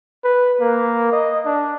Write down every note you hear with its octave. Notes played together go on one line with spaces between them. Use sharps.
B4
A#3
D#5
D4